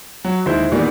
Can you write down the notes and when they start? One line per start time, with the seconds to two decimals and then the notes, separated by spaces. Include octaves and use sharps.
0.24 F#3
0.46 D#2 G#3 E4 C5
0.72 E2 A#2 D#3 G3 A#3 B3